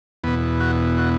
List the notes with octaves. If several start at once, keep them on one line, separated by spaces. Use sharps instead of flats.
E2 B2 B3
F#4
F#4